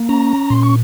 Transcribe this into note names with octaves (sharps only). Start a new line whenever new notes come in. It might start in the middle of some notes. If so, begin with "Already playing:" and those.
Already playing: A#3
C#4 A#5
A#2 C6
C#6